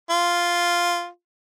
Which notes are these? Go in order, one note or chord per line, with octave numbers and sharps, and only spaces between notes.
F4